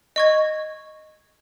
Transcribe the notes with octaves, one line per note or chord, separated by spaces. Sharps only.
D#5 C#6 G#6